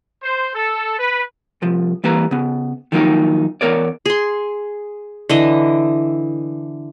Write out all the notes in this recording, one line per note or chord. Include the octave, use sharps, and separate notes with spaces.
C5
A4
B4
C2 F3
E3 G3 A#3 B4 A#5
C#3 B3
D#3 F3 F#3 A#3 C#4 D#4
E2 D#3 B3 A#4 C#5 D5
G#4 C6
D3 E3 D#5